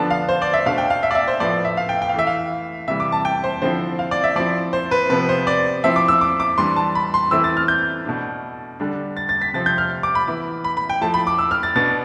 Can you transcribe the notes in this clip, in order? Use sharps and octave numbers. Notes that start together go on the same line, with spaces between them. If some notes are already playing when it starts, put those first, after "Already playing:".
Already playing: D3 F3 B3 D4 A5
F5
C5
D5
E5
B2 A3 D4 F5
G5
F5
E5
D5
E5
C5
A2 F3 B3 D5
E5
F5
G5
G5
F5
E3 A3 E4 E5
F5
C3 E3 G3 E5
D6
A5
G5
C5
D3 F3 C4 E4 C5
F5
D5
E5
F3 C4 E4 D5
C5
B4
C3 F3 B3 B4
C5
D5
F3 C4 E4 E5
D6
E6
D6
D6
E3 G3 D4 C6
A5
B5
C6
E3 A3 C4 E4 E6
A6
F6
G6
B2 A3 D4
D3 G3 D4
A6
A6
B6
C3 F3 C4 A6
G6
F6
D6
B5
E3 B3 E4
B5
B5
G5
F3 A3 E4 A5
B5
D6
E6
F6
A6
B2 B3 D4 A6